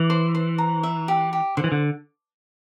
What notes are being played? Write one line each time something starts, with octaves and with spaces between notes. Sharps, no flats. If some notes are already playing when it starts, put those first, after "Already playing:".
Already playing: E3 D6
C5
C5
A#5
E5
G4
G4
D3 C5
E3
D3